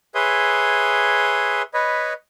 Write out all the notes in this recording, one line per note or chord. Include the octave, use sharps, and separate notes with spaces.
G#4 B4 C#5 E5 C6 D#6
B4 C#5 D#5 B5